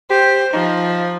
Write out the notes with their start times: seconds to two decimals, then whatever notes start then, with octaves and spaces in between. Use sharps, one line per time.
0.11 G4 C5
0.53 F3 D#4